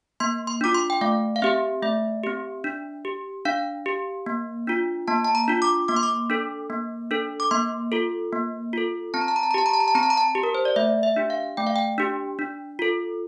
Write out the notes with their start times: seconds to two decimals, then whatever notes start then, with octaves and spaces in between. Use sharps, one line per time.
0.20 A#3 C6
0.47 C6
0.61 D4 F4 D6
0.74 C6
0.90 G5
1.01 A3 F5
1.36 F5
1.42 C4 G4 E5
1.82 A3 E5
2.23 C4 G4
2.64 D4
3.05 G4
3.45 D4 F5
3.86 G4
4.26 A#3
4.67 D4 F4
5.08 A#3 A5
5.24 A5
5.35 A#5
5.48 D4 F4
5.62 D6
5.88 A#3 D6
5.96 C6
6.03 D6
6.30 D4 A4
6.70 A#3
7.11 D4 A4
7.40 D6
7.51 A#3 C6
7.92 F4 A4
8.33 A#3
8.73 F4 A4
9.14 C4 A5
9.21 A#5
9.28 A5
9.36 A#5
9.43 A5
9.51 A#5
9.54 G4 A5
9.66 A#5
9.74 A5
9.80 A#5
9.88 A5
9.95 C4 A#5
10.03 A5
10.10 A#5
10.17 A5
10.35 G4
10.43 A#4
10.55 C5
10.65 D5
10.76 A3 E5
11.03 E5
11.16 D4 G4
11.30 F5
11.57 A3 G5
11.67 F5
11.76 G5
11.98 D4 G4
12.39 D4
12.79 F4 A4